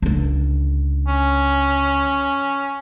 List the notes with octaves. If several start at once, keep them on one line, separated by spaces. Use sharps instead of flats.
C#2 D3
C#4